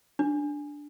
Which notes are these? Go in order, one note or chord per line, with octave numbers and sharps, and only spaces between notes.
D4